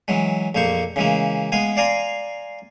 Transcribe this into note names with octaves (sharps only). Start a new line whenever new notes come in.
E3 F#3 G#3
A#1 F2 A#3 C5 C#6
C#3 E3 G#3 A#3
G#3 B3 F5 G#5
D5 F5 G#5 A#5 C6